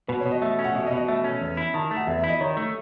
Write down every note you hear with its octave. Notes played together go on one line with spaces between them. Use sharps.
B2 B4
C#5
B2
D#5
A3 E5
C#4
F#5
B2 E5
D#5
B2
D#5
A3 E5
C#4
E2
E4
D#3 A5
A3
F#5
E2 E5
E5
E4
D#5
D#3 C#5
A3